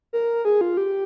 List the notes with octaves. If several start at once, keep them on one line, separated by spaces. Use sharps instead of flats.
A#4
G#4
F4
G4